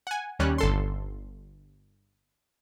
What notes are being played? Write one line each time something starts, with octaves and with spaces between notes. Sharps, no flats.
F#5 G#5
D#2 G3 C#4 F#6
G1 A4 C6